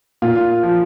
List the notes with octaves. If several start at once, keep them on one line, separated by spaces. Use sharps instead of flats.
A#2 F4
F3